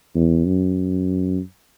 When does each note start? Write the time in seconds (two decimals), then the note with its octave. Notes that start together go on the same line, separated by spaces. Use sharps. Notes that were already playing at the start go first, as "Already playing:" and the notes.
0.15 E2
0.47 F#2